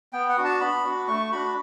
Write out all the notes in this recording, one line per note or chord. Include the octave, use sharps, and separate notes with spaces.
B3 G5
F#5
D4 F#4
A5
B3 B5
D4 F#4
A3 C#6
D4 F#4 B5